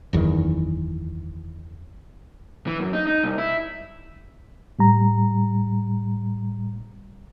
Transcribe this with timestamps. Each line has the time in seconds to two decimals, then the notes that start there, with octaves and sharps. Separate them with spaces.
0.13 F#1 E2 G2 D#3
2.67 E3
2.80 F#2
2.93 D#4
3.07 D#4
3.23 C2
3.38 E4
4.79 A2 G3 A#5